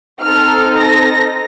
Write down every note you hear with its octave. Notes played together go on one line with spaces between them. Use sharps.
C4 D#4 A4 F6
A#6